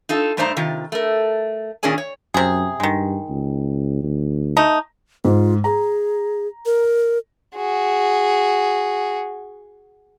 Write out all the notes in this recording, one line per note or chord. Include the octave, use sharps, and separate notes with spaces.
D#4 F4 A4
G2 A3 D#4 C5 D5 A#5
C3 D#3 F4
A3 A#4
A#2 D#3 C#4 G#4 D5 G#5
C#5
F#2 C3 G#4
G2 D#3 G#3
C#2
D2
A3 D#4
G#2 F4
G#4 A#5
A#4
F#4 G#4